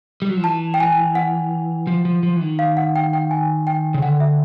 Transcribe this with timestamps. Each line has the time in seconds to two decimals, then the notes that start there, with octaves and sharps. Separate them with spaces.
0.22 G3
0.29 F#3
0.37 F3
0.44 E3 A5
0.74 G5
0.80 G#5
1.15 F#5
1.87 F3
2.05 F3
2.23 F3
2.36 E3
2.41 D#3
2.59 F5
2.77 F#5
2.96 G5
3.13 G5
3.31 G#5
3.67 G5
3.94 C#3
4.02 D3 F#5
4.20 E5